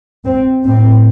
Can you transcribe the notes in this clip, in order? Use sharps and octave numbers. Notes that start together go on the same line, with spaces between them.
C4
A2 C4